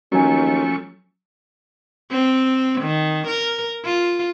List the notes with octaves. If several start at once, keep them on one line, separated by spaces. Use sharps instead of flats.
D#2 F3 F#3 A3 C#4 G#5 C#6
C4
D#3
A#4
F4